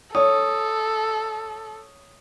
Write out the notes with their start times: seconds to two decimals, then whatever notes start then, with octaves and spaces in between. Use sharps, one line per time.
0.15 A4 C#5 D#6